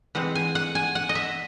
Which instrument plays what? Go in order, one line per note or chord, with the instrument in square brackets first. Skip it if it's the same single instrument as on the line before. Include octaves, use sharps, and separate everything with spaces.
[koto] E3 G#3 C4 F#5
G#5
F#5
G#5
F#5
D#5
E5